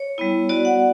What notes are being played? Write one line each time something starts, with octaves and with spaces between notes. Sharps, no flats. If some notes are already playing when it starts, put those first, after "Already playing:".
Already playing: C#5
G3 B3 E4
B3 F#4 D5
F#5